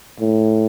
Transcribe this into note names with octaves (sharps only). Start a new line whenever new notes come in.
A2